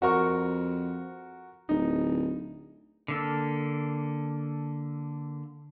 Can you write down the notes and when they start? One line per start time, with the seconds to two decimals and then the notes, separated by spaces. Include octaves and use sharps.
0.02 F2 F#4 A#4 C#6
1.69 D1 D#4
3.08 D3 A#3 A4